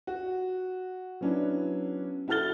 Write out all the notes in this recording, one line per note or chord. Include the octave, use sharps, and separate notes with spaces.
F#4
F#3 B3 C#4 D4 E4
E4 F#4 A4 F6 A6 G7